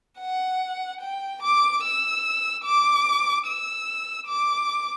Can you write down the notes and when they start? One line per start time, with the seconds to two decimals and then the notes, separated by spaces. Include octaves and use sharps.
0.20 F#5
1.01 G5
1.42 D6
1.83 E6
2.64 D6
3.47 E6
4.27 D6